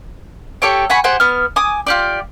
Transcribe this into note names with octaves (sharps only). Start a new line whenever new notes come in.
G4 A4 C#5 G5
F#5 G#5 B5 C#6
G4 G#4 C5 F#5
B3 F6
G#5 D6 D#6
F4 G4 D5